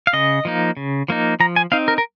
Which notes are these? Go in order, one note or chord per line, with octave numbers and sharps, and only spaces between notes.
F5
C#3 D#5
F3 A#3 D#4
C#3
F3 A#3 D#4
F3 A#5
G#5
C4 D#4 F5
A#4
A#4